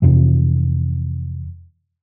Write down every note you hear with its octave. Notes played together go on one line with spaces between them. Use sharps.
F2 C3 E3